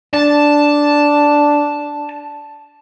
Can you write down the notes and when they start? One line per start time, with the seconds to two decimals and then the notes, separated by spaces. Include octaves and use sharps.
0.13 D4 A5